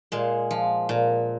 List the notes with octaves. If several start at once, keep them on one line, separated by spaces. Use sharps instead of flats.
A#2 G#3
F3
A#2